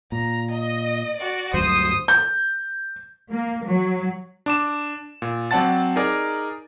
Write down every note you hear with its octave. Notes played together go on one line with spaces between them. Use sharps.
A#2 A#5
D#5
F#4 D5
D2 G2 F#3 C5 D#6
G6
A#3
F#3
D4 D6 E7
A#2
F#3 C4 D5 F#5 A5 A6
D#4 G#4 A#4 D5